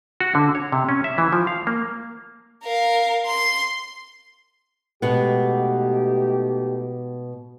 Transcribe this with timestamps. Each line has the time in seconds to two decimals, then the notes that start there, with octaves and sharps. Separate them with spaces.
0.20 F#4
0.35 D3
0.55 C#5
0.72 C3
0.89 C#4
1.04 E5
1.18 E3
1.33 F3
1.47 F5
1.67 A#3
2.63 A#4 F5
3.26 C6
5.02 B2 G#3 A3 B3 D#4 G4